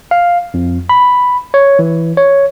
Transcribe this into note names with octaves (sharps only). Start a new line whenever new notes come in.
F5
F2
B5
C#5
E3
C#5